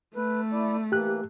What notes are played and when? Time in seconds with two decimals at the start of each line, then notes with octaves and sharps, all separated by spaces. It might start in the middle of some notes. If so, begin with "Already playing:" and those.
0.16 A3 B4
0.52 E4 D5
0.92 E3 A#3 G4 F#6